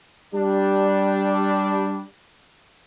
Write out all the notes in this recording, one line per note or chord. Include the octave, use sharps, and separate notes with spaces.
G3 D4